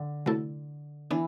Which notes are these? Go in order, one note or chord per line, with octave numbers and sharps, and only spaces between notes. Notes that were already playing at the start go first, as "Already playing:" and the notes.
Already playing: D3
C3 F#3 A3 E4 A4
E3 B3 D4